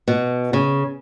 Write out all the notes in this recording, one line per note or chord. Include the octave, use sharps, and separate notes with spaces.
B2
C#3